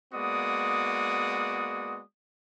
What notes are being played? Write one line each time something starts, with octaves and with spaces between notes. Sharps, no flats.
G#3 A#3 B3 F#4 D5 D#6